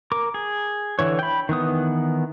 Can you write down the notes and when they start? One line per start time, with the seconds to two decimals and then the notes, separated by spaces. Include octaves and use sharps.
0.12 A#4 D6
0.34 G#4
0.99 D3 E3 C#5
1.19 G5 B5
1.49 D#3 E3 B3 D#6